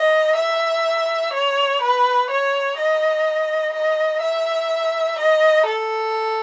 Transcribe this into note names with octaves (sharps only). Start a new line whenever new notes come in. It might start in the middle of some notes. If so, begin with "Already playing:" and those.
Already playing: D#5
E5
C#5
B4
C#5
D#5
D#5
E5
D#5
A4